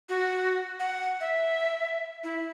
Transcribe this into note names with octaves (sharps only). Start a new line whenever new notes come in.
F#4
F#5
E5
E4